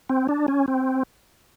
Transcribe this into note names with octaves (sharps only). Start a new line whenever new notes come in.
C4
D4
C#4
C4